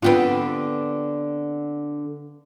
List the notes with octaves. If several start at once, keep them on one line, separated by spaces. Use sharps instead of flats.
D3 B3 C4 F4 G4 B4